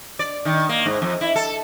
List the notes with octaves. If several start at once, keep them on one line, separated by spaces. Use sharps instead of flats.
D5
D#3
A#3
G#2
F2
E4
A4